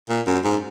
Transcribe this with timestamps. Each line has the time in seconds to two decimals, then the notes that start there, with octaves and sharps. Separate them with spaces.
0.09 A#2
0.26 F#2
0.44 G#2